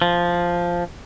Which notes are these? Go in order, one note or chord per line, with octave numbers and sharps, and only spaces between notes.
F3